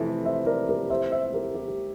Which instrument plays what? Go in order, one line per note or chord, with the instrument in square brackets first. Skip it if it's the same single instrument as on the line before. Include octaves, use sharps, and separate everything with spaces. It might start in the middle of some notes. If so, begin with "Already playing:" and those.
Already playing: [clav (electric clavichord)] F2 C3 E3 A3 [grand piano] E5
[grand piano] C5 E5
A#4 D5
G4 A#4
C5 E5
C5 E5
G4 A#4
G4